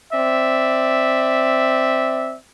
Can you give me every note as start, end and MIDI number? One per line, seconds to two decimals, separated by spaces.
0.12 2.35 60
0.12 2.35 74
0.12 2.35 76